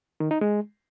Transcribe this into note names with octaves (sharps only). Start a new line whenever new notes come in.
D#3
D#4
G#3